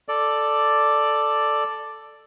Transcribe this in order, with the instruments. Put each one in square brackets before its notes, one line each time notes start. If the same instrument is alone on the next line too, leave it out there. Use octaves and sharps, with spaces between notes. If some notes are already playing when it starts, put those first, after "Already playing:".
[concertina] A4 D5